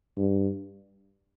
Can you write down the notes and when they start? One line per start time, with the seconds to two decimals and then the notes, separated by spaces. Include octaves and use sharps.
0.17 G2